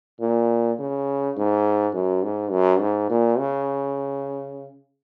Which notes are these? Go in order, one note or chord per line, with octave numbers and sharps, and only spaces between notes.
A#2
C#3
G#2
F#2
G#2
F#2
G#2
A#2
C#3